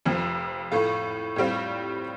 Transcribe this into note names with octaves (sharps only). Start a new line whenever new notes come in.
F1 F2 F3
A2 A3 F4
A2 G3 C4 F4